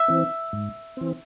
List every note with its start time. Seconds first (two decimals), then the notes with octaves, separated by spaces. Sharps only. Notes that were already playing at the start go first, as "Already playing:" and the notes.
Already playing: E5
0.08 E3 C4
0.53 G#2
0.97 E3 C4